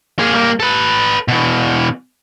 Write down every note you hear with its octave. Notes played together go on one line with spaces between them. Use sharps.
A#3 G#4
G3 A#3
A4 B4
B2 E3